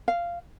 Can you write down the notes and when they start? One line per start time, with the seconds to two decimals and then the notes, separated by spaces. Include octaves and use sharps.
0.08 F5